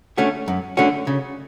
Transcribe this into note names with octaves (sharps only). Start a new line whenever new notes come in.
D3 A3 C#4 F#4
F#2
D3 A3 C#4 F#4
C#3